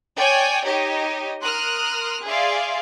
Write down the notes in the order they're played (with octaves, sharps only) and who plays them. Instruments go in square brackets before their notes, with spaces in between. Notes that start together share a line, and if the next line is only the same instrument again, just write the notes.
[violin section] C#5 D5 G5 G#5
D#4 G4 C#5 D#5
A#4 C6 D#6 F6 F#6
G#4 D5 E5 F5 C6